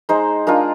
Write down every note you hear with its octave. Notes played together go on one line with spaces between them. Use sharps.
G#3 D#4 C5
G#3 D4 F4 A#4